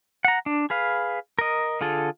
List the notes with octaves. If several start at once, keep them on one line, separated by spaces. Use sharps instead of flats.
F#5 A#5
D4
G#4 B4 F5
A#4 D#5
D3 F4 G#4 A4